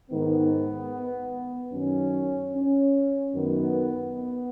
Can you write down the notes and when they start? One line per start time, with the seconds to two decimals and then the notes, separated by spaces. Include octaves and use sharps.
0.11 G#2 D#3 B3
1.72 F#2 D#3 C#4
2.54 C#4
3.34 F#2 D#3 B3
4.16 B3